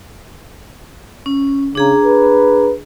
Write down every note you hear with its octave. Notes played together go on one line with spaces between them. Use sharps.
C#4
C#3 D4 G#4 A#5
B4